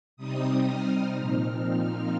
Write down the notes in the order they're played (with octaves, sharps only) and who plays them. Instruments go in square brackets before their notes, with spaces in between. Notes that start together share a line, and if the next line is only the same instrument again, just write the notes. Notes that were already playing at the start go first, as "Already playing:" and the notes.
[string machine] C3 G3 C4 D#4 D#6
F6
A#2 F3 C4 D#4